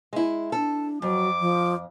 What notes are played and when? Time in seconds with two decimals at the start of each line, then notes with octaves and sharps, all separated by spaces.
0.13 G#3 E4
0.52 D4 A4
1.02 F2 F#3 D6
1.40 F3